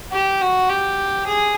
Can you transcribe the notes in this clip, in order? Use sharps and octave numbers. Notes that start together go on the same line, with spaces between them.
G4
F#4
G4
G#4